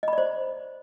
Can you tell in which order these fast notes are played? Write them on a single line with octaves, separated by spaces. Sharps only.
D#5 B5 D5 C5